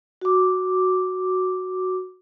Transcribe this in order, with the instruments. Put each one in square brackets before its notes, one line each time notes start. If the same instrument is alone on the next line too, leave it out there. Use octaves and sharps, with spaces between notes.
[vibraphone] F#4 D6